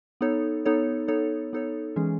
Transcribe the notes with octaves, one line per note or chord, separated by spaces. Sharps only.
B3 D#4 A4 C#5
B3 D#4 A4 C#5
B3 D#4 A4 C#5
B3 D#4 A4 C#5
E3 G#3 C#4 G#4